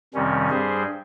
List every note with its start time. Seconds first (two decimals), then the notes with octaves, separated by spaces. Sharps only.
0.14 F2 C3 D#3 G3 C#4
0.50 G2 G3 G#4 C5